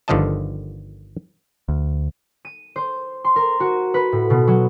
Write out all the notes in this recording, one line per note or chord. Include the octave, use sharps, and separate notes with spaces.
G1 D3 D#3 F3 D#5 A5
D2
D#7
C5
C6
A#4
F#4
B4
A2
B2
F#3